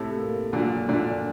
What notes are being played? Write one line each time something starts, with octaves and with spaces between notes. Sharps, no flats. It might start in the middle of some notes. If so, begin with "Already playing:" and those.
Already playing: A2 C3 A4
A#3
A#2 D3 F#3
A#2 D3 D4